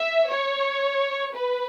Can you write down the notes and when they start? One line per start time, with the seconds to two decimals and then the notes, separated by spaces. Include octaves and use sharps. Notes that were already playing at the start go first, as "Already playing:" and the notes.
Already playing: E5
0.30 C#5
1.34 B4